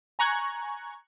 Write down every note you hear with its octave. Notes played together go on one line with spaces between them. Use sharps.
G#5 A#5 C#6 F#6 G#6